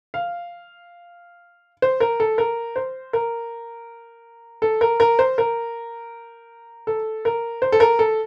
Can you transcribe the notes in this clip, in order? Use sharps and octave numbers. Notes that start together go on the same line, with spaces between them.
F5
C5
A#4
A4
A#4
C5
A#4
A4
A#4
A#4
C5
A#4
A4
A#4
C5
A4
A#4
A4